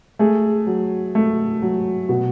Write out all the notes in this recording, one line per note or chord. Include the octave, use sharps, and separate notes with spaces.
A3 G#4
F#3
A3
F#3
B2 F#4